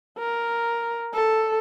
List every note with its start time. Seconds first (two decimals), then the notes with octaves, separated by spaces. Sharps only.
0.19 A#4
1.14 A4